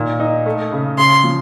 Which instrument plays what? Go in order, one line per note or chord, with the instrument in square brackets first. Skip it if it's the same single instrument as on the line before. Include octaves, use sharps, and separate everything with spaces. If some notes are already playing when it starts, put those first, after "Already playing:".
Already playing: [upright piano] A#2 D#3
D#4
A3
C#3
[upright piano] C#3 [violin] C6
[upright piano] F3